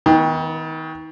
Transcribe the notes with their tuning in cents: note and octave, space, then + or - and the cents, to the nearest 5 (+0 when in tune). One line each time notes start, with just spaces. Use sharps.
D#3 +35 B3 +0